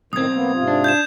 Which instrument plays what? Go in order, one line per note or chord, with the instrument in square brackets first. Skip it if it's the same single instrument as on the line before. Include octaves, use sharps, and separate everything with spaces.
[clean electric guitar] B1 C4 [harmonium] A2 D#3 [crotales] D#6 G#6
[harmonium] A#3 B3
G#2 C3 F4
[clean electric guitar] D4
[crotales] G6 G#6 E7